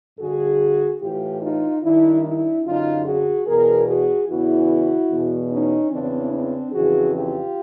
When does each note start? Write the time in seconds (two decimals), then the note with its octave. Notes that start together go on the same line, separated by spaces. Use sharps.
0.19 G2 D3 F#4 G#4
1.00 A2 E3 F4 G4
1.41 D#4 F4
1.82 G2 D#3 D4 E4
2.23 D4 E4
2.63 F#2 D3 D#4 F4
3.04 F#4 G#4
3.45 E2 B2 G#4 A#4
3.86 F#4 G#4
4.27 E2 C#3 E3 E4 F#4
5.09 E2 B2
5.50 C#4 D#4
5.90 E2 C#3 E3 C4 D4
6.31 C4 D4
6.72 F2 C#3 E3 F#4 G#4
7.13 F4 G4